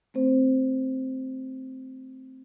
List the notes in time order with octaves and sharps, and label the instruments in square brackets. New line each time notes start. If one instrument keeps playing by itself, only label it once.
[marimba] A3 C4 C5